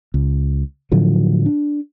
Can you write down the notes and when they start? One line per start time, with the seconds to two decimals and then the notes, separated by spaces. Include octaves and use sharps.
0.14 C#2
0.92 A2 D3 F3 F#3
1.46 D4